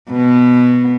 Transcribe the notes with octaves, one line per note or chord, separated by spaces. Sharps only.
B2 B3